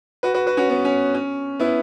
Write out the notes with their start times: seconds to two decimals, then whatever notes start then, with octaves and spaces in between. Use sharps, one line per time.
0.23 F#4 B4
0.34 F#4 B4
0.46 F#4 B4
0.57 C#4 F#4
0.69 B3
0.85 C#4
1.15 C#4
1.60 B3 E4